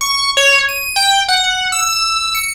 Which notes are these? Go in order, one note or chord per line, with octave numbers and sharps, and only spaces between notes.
C#6
C#5
D#7
G5
F#5
E6
C#7